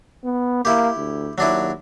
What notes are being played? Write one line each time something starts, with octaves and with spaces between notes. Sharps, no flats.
B3
A#3 E4 G4
D2
D#2 F#3 D4 E4